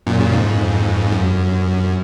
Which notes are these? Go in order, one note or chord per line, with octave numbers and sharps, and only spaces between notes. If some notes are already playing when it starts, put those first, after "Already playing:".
F#2 A#2
A#2 C#3
F2 G#2
F#2